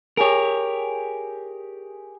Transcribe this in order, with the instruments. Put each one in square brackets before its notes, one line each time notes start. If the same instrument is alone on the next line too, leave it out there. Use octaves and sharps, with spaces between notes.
[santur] G4 G#4 [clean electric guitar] A#4 C#5